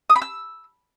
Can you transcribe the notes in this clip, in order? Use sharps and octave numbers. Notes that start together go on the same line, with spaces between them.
D#6
B5
E6